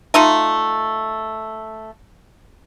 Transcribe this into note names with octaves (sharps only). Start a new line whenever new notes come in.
A3 D#4 F4